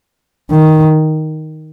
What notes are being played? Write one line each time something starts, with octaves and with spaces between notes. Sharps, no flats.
D#3